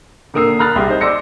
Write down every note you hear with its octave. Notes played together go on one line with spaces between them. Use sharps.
A#2 D3 A#4 D#6 E6 C7
A#5 B5 F6 F#6 A6
C2 G4 G#4 C6
D#4 C5
D5 C6 D6 E6 A#6 C#7